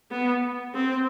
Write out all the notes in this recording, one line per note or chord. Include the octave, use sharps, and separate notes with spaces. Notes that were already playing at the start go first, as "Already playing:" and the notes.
B3
C4